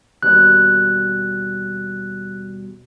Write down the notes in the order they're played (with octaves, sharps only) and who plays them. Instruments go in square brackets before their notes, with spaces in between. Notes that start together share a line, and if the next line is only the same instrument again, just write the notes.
[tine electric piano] D#2 B2 G3 [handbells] F#6